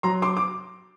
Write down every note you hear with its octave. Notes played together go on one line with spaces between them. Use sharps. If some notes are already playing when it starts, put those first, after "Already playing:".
F#3 A#5 C6
C6 D6
D6